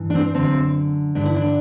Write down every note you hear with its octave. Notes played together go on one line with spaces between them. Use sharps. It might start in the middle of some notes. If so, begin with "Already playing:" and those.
Already playing: G2 E3
D4
C4
F#2 D3 C4
G2 D3 D4
E4
D4